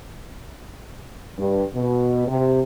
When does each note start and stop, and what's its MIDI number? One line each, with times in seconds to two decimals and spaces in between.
1.39 1.64 43
1.75 2.24 47
2.28 2.61 48